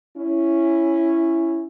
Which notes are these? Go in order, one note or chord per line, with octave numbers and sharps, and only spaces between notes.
C#4 E4